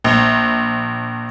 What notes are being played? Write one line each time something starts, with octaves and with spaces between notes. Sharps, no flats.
A#1